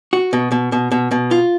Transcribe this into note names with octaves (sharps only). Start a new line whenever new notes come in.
F#4
B2
B2
B2
B2
B2
F4